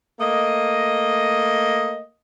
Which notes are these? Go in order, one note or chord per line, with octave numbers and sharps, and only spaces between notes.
A3 A#3 D#5